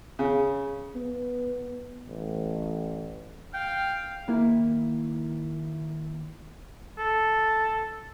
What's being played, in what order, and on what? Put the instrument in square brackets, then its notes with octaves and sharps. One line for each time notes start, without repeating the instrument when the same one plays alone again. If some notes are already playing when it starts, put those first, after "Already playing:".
[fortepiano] C#3
[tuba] B3
A1
[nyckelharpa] F5 [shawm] G5
[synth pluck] D#3 A#3 E4
[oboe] A4